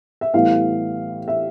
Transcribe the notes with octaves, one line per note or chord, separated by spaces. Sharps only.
E5
A2 E3 G3 B3 F5
E5